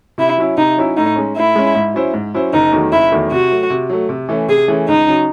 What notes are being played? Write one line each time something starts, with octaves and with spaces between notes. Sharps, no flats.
C3 E4
F#3 C#4 E4
C3 D#4
F#3 C#4 E4
A2 D#4
G#3 C#4
A2 E4
G#3 C#4
G#2
F#3 C#4 E4 C5
G#2
F#3 C#4 E4 C5
F#1 D#4
E2 D#3 F#3 A3
F#1 E4
E2 D#3 F#3 A3
C3 F#4
F#3 A3
C3
F#3 A3
C3
E3 A3 C#4
C3 G#4
E3 A3 C#4
C#2 D#4
C#3 F#3